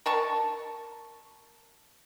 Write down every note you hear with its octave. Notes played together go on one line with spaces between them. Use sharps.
A#4 A5 C#6